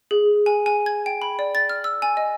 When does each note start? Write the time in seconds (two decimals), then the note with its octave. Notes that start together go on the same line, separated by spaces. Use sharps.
0.11 G#4
0.46 G#5
0.66 G#5
0.86 G#6
1.06 G5
1.22 B5
1.39 D5
1.55 A6
1.69 F6
1.84 E6
2.02 G#5
2.17 D#5